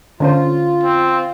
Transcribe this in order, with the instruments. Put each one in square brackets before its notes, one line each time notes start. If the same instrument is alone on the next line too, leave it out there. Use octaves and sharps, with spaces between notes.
[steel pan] D3 C#4 C5 [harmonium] F4
[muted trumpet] C4